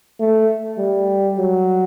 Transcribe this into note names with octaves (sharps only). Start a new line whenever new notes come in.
A3
G3
F#3